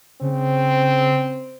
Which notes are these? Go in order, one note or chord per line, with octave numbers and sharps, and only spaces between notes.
C#3 C4